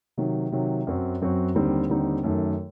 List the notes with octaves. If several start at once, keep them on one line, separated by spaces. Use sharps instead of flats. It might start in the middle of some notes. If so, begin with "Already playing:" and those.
C3 D#3 F#3
C3 D#3 F#3
F#2 F#3 C4 F#4
F#2 F#3 C4 F#4
D#2 D3 G3 C4 D#4
D#2 D3 G3 C4 D#4
F#2 D#3 A3